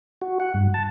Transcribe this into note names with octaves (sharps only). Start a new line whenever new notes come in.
F#4
F#5
G2
A5